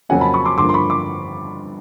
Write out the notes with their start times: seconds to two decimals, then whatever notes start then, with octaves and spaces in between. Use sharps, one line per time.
0.09 F2 C#3 F#3 A#3 C#4 F#5 G#5
0.21 A5 B5
0.34 B5 C#6
0.45 C6 D6
0.57 G2 D3 F3 A#3 C6 D6
0.69 C6
0.74 B5 C#6
0.90 C6 D6